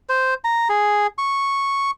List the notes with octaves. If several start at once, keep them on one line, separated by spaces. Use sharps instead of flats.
C5
A#5
G#4
C#6